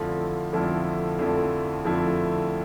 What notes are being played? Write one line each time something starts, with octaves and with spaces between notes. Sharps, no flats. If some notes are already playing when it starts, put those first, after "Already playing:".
Already playing: F2 D3 F3 A3 E4
F2 D3 F3 A3 E4
F2 D3 F3 A3 E4
F2 D3 F3 A3 E4